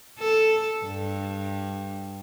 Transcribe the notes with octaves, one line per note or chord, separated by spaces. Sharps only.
A4
G2